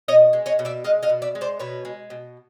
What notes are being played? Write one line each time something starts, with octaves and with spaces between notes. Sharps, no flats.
B2 C#5 D#5
G#3
C#5 D#5
B2
D5 E5
G#3 D#5 F5
D#5 F5
B2
D5 E5
G#3
C5 D5
B2 B4 C#5
G#3
B2